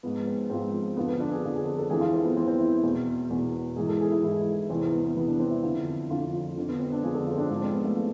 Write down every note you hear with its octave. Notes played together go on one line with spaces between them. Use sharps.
G#2 F3 B3
C4
G#2 F3 C4
F2 D3 F3 B3
B3
D4
G#4
F2 D3 F3 G#4
G#4
A4
A4
F2 E3 G#4
F4
C4
B3
F2 E3 C4
C4
E4
E2 B2
E2 B2
G#2 E3 G#4
A4
G#4
E4
G#2 E3 E4
E2 C3 E3 C4
B3
B3
B3
E2 C3 E3 B3
D4
C4
E4
F2 D3 F3
F2 D3 F3 F4
F4
F2 D3 F3
B3
C4
D4
F2 D3 F3 G#4
A4
F4
C4
D4
G#2 F3 D4
C4
B3
A3
F3